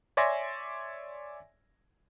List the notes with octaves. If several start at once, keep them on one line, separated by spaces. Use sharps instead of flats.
C#5 D5 E5 G#5 C6 A#6